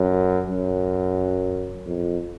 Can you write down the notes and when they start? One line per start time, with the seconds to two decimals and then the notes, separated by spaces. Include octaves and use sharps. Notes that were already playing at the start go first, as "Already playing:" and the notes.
Already playing: F#2
0.50 F#2
1.87 F2